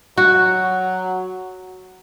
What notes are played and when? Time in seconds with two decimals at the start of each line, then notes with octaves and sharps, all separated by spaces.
0.17 F#3 F#4